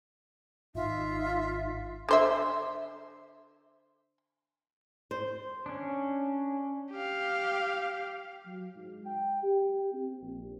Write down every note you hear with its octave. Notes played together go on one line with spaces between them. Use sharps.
G#1 D#4 F4 E5
D3 C5 E5
C5
C#4 D4
G4 F5
F#3
G#2
G5
G4
C4
A#1